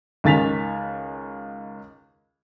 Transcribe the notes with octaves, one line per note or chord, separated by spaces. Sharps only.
C#2 D#3 G#5 A6 B6 F7